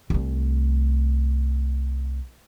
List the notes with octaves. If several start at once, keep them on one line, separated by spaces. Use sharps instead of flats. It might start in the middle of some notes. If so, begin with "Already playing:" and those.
C2 A3